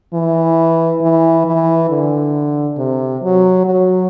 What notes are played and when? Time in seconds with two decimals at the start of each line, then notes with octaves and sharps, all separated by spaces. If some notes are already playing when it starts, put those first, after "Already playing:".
0.14 E3
1.01 E3
1.46 E3
1.90 D3
2.78 C3
3.23 F#3
3.66 F#3